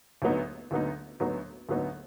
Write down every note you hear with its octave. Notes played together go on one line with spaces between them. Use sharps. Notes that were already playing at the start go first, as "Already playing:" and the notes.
D2 D3 F#3 B3 D#4
D2 D3 F#3 B3 D#4
D2 D3 F#3 B3 D#4
D2 D3 F#3 B3 D#4